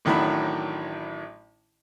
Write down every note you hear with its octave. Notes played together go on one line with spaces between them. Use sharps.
A1 A2 D#3 F#3 D4 B5